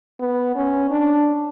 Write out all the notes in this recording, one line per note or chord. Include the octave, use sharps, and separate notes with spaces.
B3
C#4
D4